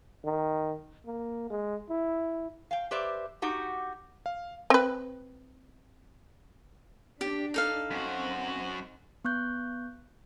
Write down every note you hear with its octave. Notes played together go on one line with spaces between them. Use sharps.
D#3
A#3
G#3
E4
F5 G5
G4 B4 C5 D5 E5
D#4 F#4 G4
F5
C4 B4
D4 G4
D#4 A4 F5
F#2 C4 F#4
B3 C#6 F#6 G6